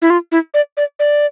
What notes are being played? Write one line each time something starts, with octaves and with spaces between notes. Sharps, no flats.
E4
F4
E4
D5
D5
D5